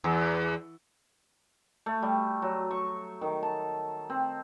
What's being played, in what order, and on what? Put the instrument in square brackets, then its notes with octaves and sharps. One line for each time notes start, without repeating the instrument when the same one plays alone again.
[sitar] E2
[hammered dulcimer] A3
G3
F#3
C#6
D#3
A5
C4